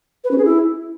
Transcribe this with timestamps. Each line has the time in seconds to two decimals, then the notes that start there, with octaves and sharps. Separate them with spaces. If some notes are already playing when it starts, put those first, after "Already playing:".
0.24 B4
0.31 C#4
0.38 G#4
0.45 E4